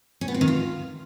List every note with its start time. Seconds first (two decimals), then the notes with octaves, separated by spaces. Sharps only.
0.21 C#4
0.28 B3
0.34 C4
0.41 D#3
0.48 F4